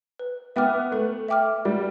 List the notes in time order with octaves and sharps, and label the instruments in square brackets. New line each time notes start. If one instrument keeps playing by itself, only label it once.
[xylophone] B4
[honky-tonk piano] B3 [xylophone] E5 G5 D6 F6
[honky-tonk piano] A3 [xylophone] B4
[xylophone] E5 G5 D6 F6
[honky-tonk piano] G3 [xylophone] D5